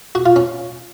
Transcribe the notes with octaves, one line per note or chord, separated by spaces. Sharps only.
F#4
F4
C#4